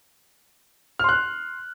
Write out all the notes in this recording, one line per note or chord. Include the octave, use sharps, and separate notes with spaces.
C6 F6 F#6